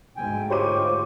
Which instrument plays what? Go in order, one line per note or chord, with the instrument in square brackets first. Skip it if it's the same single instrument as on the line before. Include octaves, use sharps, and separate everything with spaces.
[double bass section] D2 G#2 [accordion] G5 G#5
[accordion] F4 C#6 [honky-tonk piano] G4 C5 D#7 [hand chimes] C#5 D6